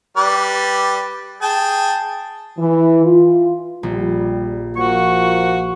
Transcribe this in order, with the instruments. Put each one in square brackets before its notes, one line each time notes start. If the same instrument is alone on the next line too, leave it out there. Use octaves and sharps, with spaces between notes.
[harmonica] G3 B4 D5
G#4 G5 A5
[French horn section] E3
F4
[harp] A#1 [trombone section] G3
[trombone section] F3 A#3 [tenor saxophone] F#4 [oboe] C#6